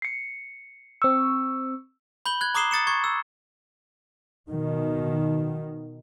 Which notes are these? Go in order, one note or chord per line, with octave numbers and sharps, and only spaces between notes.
C7 C#7
C4 C#6 E6
B5 G6 F#7 G7
F#6 G#6
A#5 D6 D#6 C7 E7 G7
D#6 A6 C#7 E7
C#6 G#6
E6
B2 D#3